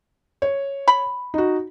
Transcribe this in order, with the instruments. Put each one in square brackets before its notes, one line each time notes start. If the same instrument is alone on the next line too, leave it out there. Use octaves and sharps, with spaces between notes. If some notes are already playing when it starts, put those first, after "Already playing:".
[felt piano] C#5
[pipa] B5
[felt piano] D#4 F#4